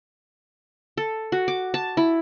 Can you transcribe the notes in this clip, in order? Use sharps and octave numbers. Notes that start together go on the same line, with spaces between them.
A4
F#4
D6
A5
E4